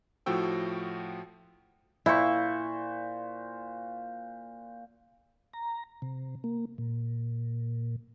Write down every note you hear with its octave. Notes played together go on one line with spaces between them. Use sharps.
A2 F3 F#4 G5 E6
A#2 E4 C5 C#6
A#5
C3
A#3
A#2